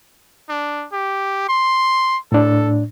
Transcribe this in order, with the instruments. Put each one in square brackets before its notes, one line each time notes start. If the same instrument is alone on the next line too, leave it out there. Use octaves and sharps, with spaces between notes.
[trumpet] D4
G4
C6
[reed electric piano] A2 D4 [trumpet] A4